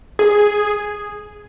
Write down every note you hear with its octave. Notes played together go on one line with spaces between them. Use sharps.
G#4